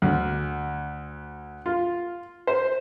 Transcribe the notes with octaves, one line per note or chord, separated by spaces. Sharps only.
D2
F4
C5